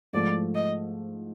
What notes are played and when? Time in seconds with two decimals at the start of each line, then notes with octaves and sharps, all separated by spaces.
0.13 G#2 F3 A3 D5
0.55 D#5